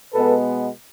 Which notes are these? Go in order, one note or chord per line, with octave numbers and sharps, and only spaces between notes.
B2 G#3 B3 A4 B4